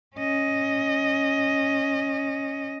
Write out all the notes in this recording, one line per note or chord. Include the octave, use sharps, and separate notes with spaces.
C#4 D#5